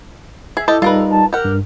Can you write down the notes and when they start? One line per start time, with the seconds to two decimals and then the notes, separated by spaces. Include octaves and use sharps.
0.57 G#4 E5
0.68 E4 G4 A4 D#5 A5
0.82 G3 D#4 F4 A#4 B4
1.10 A5
1.33 G4 A#4 F#5
1.45 G2